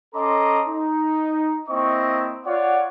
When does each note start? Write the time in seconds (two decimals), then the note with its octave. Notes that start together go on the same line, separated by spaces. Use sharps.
0.15 C#4 A4 D#5 A#5 C6 D6
0.68 D#4
1.69 A#3 C4 E4 D#5 C#6
2.46 F4 C#5 D5 F#5